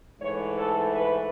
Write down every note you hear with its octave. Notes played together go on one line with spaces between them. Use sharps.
G#2 E3 A3 C#5
A4
B4